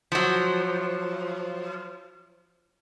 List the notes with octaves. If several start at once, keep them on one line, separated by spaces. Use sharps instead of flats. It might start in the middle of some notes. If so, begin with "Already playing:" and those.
F3 F#3